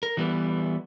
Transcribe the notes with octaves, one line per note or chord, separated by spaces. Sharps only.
A#4
E3 G3 B3